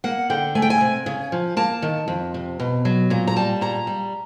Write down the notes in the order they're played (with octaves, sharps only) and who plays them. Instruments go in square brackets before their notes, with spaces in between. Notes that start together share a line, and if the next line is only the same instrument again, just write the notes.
[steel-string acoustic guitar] A#3 F#5
D3 G5
A3 G#5
G5
G#5
C3
C#3
F3
A#3 A5
D#3
F2
C3
B2
F#3
A#2 A#5
A#5
G3 A5
A#2 A#5
G3